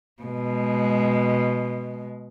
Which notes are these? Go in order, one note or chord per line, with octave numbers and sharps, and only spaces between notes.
B2 G#3